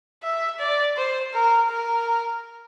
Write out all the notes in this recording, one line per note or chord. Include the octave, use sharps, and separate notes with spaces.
E5
D5
C5
A#4
A#4